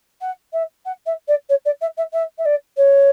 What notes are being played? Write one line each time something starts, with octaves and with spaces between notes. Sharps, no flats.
F#5
E5
F#5
E5
D5
C#5
D5
E5
E5
E5
E5
D5
C#5